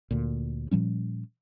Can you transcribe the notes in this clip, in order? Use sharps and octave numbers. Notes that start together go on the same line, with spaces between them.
D2 A#2
A#2 F3 G3 C#4